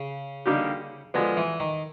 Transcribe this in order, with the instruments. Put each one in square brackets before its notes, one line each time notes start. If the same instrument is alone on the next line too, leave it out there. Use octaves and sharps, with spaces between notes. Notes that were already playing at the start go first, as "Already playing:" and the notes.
Already playing: [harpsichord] C#3
[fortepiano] D3 G3 A#3 D#4 G4
[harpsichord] D3 [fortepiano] F3 G#3 B3
[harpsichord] E3
D#3